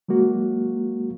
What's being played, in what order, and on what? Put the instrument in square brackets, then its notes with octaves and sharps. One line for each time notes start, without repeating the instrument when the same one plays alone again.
[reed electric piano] F#3 G#3 A#3 F#4